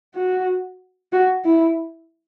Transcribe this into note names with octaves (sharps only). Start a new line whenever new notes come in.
F#4
F#4
E4